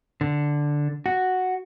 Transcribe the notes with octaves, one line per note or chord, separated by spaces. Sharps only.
D3
F#4